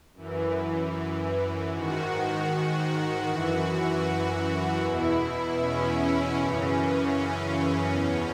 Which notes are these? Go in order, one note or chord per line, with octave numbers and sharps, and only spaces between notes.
F#2 E3
G#2 D#3 F#4
F#4
F#2 E3
E2 B2 E4
C#4
F#2 C#3 E3
C#4
E2 B2 C#4